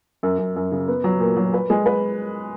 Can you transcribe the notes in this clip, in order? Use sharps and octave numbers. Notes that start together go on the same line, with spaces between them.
F#2
F#2
F#2
C#3
B3
F#3
A#2
F#3
B4
G#3
B4